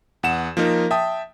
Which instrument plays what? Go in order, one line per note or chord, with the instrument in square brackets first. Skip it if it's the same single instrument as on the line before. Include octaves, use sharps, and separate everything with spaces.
[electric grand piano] E2 F#5 E7
F3 A#3 D#4 A#4
E5 G5 A5 D#6